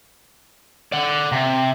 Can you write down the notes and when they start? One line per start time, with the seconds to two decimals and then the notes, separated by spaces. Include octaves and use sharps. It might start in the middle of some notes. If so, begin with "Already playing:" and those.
0.92 D5 F#5
1.32 C3